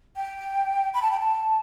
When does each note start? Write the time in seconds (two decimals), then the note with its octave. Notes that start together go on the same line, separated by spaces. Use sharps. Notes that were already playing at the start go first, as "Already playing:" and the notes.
0.16 G5
0.94 B5
1.02 A5
1.11 G5
1.20 A5